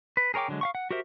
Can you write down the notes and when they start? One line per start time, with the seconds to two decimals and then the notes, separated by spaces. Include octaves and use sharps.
0.17 B4
0.34 G#4 A#4 C#5 G5 D6
0.48 D3 F#3 G#3
0.61 F5 F#5 C#6
0.75 F#5
0.91 F#4 G4 A#4 C5 E5